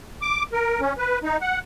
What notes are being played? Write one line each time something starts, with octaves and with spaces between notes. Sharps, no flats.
D6
A#4
C#4
B4
D#4
F#5